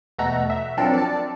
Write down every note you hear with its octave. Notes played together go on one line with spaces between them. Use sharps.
E2 B2 A3 F#4 A#5 E6
E5
F3 F#3 C4 D4 A4 A#4
D5 A5